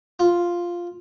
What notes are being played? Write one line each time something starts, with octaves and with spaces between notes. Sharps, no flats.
F4